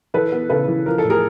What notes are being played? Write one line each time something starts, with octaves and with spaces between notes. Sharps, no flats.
E3 A4 B4
B3
C#3 A4 B4
E3
F3 A#4
A4
A2
G#4 A#4